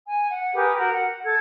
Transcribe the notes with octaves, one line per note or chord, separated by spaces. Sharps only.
G#5
F#5
G4 G#4 A#4 B4
F#4 A#4
F#5
A4 G#6